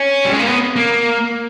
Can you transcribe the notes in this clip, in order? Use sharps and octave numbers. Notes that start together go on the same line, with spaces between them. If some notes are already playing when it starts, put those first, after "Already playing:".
Already playing: C#4
G3
G#3
A#3
B3
A#3